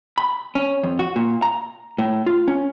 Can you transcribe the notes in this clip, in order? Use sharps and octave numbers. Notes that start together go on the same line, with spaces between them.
B5
C#4
F2
F#4
A#2
A#5
A2
F4
C#4